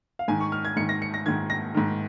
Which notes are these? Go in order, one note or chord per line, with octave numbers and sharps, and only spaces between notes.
F5
G#2 D#3 G#5
C#6
F6
G#6
G#2 D#3 C#7
A#6
C#7
A#6
G#2 D#3 G#6
A#6
G#2 D#3